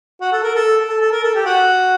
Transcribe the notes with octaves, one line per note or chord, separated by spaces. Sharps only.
F#4
A4
A#4
A4
A4
A4
A#4
A4
G4
F#4